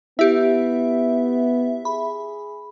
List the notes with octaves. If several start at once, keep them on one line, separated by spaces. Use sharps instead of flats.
B3 E4 G4 E5
G#4 B5